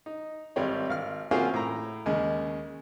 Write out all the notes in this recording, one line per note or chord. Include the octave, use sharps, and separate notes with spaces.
D#4
G#1 G3 C4 C#5
G#1 F5 F6
A#3 C4 C#4 F4 F#4 G#4
A2 A#5
D#2 C#3 G#3